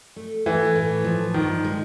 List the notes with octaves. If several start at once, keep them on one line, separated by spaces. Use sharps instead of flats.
A3
E3 A3
A2
F3
G2 D#3
G#3